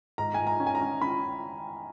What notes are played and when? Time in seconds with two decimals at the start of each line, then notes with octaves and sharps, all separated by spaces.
0.18 G#2 A#5
0.34 G#2 G#5
0.47 A#5
0.60 C#4
0.67 G#5
0.75 A#5
0.81 C#4
1.02 C#4 B5